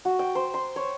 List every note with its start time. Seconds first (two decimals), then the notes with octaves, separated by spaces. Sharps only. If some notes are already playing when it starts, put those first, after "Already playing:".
0.05 F#4
0.19 G5
0.35 C5
0.54 C6
0.76 C#5